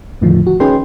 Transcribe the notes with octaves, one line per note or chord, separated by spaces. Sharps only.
E2 A2 D3 D#3 F3
F#4
C#4 D#4 G#4 B4 G5 C6